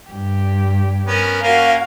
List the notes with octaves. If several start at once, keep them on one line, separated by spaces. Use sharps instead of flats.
G2 G4
B3 C#4 A#4
A#3 C#4 F#4 A#4 F5